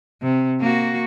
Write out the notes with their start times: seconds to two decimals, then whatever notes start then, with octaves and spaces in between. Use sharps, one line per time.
0.22 C3
0.61 A#3 F#4